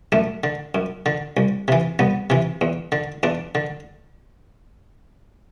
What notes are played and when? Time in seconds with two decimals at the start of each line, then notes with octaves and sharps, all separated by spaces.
0.12 F#2 A3
0.44 D3
0.75 F#2
1.06 D3
1.37 C2
1.68 C3 E3
1.99 C2 B3
2.30 C3 E3
2.61 E2
2.92 D3
3.23 E2 D4
3.55 D3